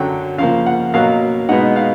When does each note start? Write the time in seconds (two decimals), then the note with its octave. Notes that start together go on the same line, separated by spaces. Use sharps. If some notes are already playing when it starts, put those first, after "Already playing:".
Already playing: F#2 D3 F#3 G5
0.38 C#3 F3 A#3 F5
0.66 F#5
0.94 B2 F#3 A#3 F5
1.49 B2 G#3 B3 D#4 F#5
1.76 F5